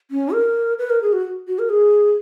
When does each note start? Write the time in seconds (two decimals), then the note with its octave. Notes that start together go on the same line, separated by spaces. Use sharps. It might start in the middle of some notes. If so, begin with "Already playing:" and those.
0.11 C#4
0.33 A#4
0.79 B4
0.90 A#4
1.02 G#4
1.13 F#4
1.48 F#4
1.59 A#4
1.69 G#4